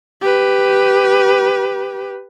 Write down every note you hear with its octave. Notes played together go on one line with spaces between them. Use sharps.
G4 B4